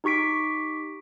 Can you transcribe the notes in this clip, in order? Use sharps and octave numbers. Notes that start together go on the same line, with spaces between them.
D#4 G4 C#6 B6 D7